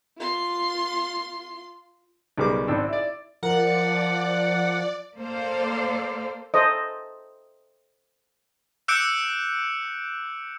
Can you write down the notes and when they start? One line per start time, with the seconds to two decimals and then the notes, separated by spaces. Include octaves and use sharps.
0.18 F4 C6
2.38 B1 C#3 G3 A#4 D6
2.68 G#1 C4 D4 E6
2.88 E4 D5
3.43 F3 A#4 D5 F#5
5.17 A#3 A4 C5 D5 F5
6.54 A4 C5 D#5
8.88 D6 E6 F#6 G6 C#7 D7